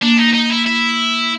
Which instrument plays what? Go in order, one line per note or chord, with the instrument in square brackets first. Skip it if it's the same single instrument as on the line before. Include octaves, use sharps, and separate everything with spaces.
[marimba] A#3 [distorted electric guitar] D4
[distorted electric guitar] D#4
D#4
E4
E4